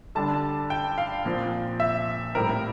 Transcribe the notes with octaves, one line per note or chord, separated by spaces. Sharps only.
D3 G3 D4 A5
G5
F5
A#2 F3 C4
E5
A2 G3 C4 A#4